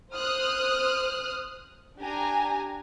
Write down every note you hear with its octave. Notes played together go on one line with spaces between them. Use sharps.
C5 D#6 F6 F#6
D4 G4 G#5 A#5